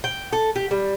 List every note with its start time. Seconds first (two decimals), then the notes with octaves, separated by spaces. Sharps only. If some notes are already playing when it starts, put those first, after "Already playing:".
0.04 G5
0.33 A4
0.56 G4
0.71 G3